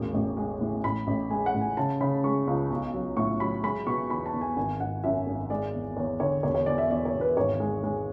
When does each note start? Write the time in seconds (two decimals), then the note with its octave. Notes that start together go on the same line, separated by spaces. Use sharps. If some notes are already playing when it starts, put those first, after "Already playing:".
Already playing: E1 A1
0.14 A1
0.37 G#3
0.61 A2
0.84 A1 B5
1.07 A1
1.30 G#3 G#5
1.46 F#5
1.54 A1
1.61 G#5
1.77 C#3 A5
2.01 C#3 B5
2.24 G#3 C#6
2.47 C#2
2.71 B1
2.94 F#3
3.17 A2 C#6
3.40 F#3 B5
3.63 G#3 B5
3.87 B2 C#6
4.10 E2 B5
4.26 A5
4.33 E2
4.41 G#5
4.57 G#1 G#5
4.80 G#1 F#5
5.04 F#2 E5
5.27 G#1
5.50 G#3 D5
5.74 E2
5.97 E2 C#5
6.20 D3 C#5
6.43 E1 C#5
6.55 C#5
6.66 E2 D5
6.78 E5
6.90 E2 D5
7.05 C#5
7.14 E1
7.21 B4
7.37 G#1 C#5
7.60 G#3
7.83 G#3